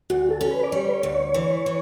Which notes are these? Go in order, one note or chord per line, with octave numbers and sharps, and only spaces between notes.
D2 F#4
A4
C#4
B4
D5
G3 C#5
B4
C#5
D2
C#5
E3
E3